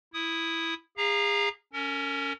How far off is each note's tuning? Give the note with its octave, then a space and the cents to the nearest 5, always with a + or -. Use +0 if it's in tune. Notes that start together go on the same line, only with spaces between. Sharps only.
E4 +0 D#6 +0
G#4 -35 F5 +0 A#5 +0
C#4 +15 A#4 -35